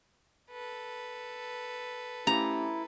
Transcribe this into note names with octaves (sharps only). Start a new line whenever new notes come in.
A4 B4
A3 C#4 E4 G4 A#5